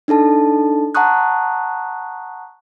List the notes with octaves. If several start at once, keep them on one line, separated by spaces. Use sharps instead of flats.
D4 D#4 A4 A5
F#5 A5 A#5 C#6 D#6 F#6